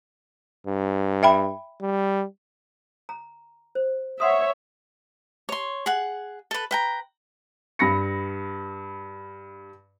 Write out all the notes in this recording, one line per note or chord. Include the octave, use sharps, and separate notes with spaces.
G2
E5 G5 B5
G3
A#5
C5
C#5 E5 F#5 C6 D#6
C#5 C6
G#4 F#5
A4 B4
B4 G5 A#5
G2 B5 A#6 C#7